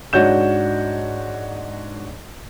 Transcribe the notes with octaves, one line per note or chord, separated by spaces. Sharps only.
G#2 D4 F#4 C#5 G6 E7